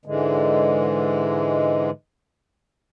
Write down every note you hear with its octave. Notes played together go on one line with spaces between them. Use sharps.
G#2 D3 E3 G#3